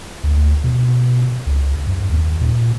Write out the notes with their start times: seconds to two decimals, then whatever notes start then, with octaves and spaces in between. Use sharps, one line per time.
0.24 D2
0.64 B2
1.46 C#2
1.87 F#2
2.10 D#2
2.41 A#2